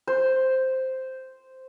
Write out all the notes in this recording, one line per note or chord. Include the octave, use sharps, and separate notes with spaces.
C5